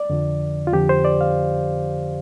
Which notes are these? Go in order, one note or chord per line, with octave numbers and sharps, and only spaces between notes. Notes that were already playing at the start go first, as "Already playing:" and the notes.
Already playing: D5
F2 D3 F3
F4
F2 D3 F3 G4
C5
D5
F5